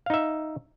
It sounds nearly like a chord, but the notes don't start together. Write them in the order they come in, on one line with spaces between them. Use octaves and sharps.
F5 D#4 E5